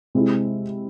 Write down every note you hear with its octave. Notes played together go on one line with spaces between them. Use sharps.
C3 G#3 C4 E4